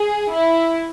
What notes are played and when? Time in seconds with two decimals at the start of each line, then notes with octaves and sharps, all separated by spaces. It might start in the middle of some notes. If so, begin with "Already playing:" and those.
Already playing: G#4
0.31 E4